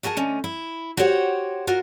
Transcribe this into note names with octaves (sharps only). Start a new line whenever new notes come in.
E4 F#4 G#4 A#4 A5
D3 A3 C#4 D#5
E4
F#4 G4 C5 C#5 F5 F#5
F4 F#4 A#4